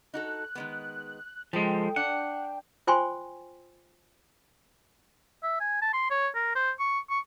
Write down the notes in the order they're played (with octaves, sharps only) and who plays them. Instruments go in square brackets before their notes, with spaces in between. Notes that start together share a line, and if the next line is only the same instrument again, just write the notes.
[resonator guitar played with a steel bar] D#4 F#4 A4 [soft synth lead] F#6
[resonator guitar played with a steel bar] D#3 G#3 B3
[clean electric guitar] F3 G#3 [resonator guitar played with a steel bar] A4 [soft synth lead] G5
[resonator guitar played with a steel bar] D4 [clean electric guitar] F#5
[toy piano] F4 C5 G5 G#5 C6 C#6
[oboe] E5
G#5
A5
C6
C#5
A#4
C5
C#6
C#6